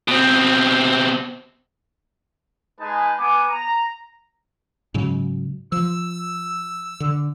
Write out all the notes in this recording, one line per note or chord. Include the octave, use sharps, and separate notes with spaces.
B2 C4
G#3 D#4 G#4 B4 G#5 A5
B3 G#5 D6
A#5
G#2 C#3 F#3
F3 E6
D3